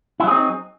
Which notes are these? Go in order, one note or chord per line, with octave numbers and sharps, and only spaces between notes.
F#3 C4 D#4 E4 G#4